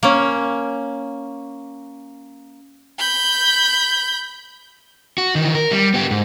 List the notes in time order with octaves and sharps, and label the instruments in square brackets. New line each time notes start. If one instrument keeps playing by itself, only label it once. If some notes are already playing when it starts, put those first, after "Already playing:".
[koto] A#3 C#4
[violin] B5 G6
[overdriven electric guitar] F#4
D#3 E3
A#4
G3
B3 G4
G#2